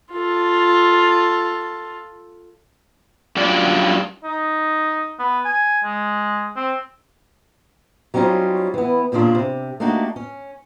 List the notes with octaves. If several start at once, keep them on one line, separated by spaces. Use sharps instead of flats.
F4 A4
F#2 G3 D4 F4 D5
D#4
B3
G#5
G#3
C4
F#3 G3 C4 C#4 D#4 F4
E3 B3
E2 A#2 C#3 D4 F4
C3
A3 A#3 D4 D#4 F#4 G4
C#4